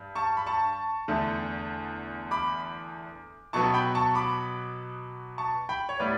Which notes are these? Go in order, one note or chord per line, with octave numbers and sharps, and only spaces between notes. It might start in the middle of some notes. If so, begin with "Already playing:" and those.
Already playing: G2
A5 C#6
B5
A5 C#6
E2 D3 A3
B5 D6
B2 F#3 B3 A5 C#6
G5 B5
A5 C#6
B5 D6
A5 C#6
G5 B5
C#5
A2 G3 B3 B4 D5